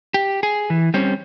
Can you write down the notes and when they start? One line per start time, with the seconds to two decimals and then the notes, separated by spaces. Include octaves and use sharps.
0.14 G4
0.43 G#4
0.70 E3
0.94 G3 C4 C#4